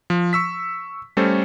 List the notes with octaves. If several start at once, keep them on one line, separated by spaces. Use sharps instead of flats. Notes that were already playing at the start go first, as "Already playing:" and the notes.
F3
C#6 E6 B6
G3 A3 C#4 A4 C5